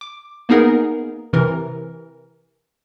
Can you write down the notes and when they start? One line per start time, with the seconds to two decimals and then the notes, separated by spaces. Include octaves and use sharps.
0.01 D6
0.49 A#3 B3 D#4 G#4 A#4
1.33 C3 E3 A#4